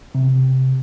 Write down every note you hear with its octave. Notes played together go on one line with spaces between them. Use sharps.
C3